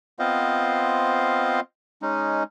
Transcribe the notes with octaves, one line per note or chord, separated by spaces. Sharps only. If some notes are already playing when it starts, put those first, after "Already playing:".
B3 C4 F4 C5 D#5 F5
G#3 C#4 D#4